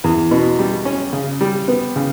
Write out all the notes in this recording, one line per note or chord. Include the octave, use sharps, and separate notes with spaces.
E2
B2
G3
C#4
C#3
G3
B3
C#3